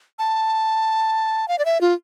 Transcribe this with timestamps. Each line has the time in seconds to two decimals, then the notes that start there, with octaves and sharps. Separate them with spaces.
0.19 A5
1.48 F5
1.59 D5
1.65 E5
1.81 F4